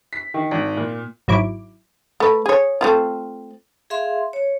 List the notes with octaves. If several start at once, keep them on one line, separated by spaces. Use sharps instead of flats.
B6
D#3
G#1
A#2
G#1 F#3 E4 D6
A3 B4
G#4 C#5
A3 C4 F4
G#4 E5 F5 C6
C#5